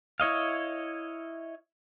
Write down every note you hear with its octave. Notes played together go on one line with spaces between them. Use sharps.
E4 C#5 D#5 F5